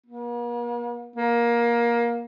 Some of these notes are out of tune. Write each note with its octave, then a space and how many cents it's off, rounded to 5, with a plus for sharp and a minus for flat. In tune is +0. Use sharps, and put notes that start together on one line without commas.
A#3 +45
A#3 +20